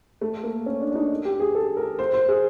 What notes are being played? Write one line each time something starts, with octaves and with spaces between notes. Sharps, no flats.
A3
A#3
C#4
D4
D4
D#4
G4
G#4
A4
A#4
C5
C5
G#4